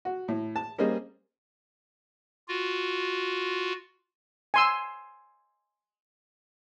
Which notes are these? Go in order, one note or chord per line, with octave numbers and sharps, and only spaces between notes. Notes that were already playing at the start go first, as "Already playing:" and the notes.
F#4
A2
A5
G3 A#3 C#4 G#4 C5 D#5
F4 F#4
G#5 C6 E6